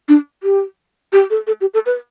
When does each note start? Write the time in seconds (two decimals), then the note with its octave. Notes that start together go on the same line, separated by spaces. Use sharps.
0.08 D4
0.43 G4
1.13 G4
1.30 A4
1.47 A4
1.61 G4
1.74 A4
1.86 B4